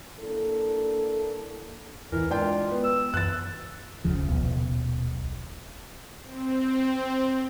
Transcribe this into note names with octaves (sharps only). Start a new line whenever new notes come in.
A#3 D4 E4 A4
E2 G#2 E3 A#4
G#3 D4 F4 G5
B3
E6
F#2 E3 F#6 A6
F1 D2 C#3 F3
D#1 B1 B3
C4